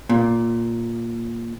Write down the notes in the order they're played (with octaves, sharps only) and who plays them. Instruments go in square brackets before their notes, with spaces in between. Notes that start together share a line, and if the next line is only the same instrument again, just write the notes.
[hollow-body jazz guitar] A#2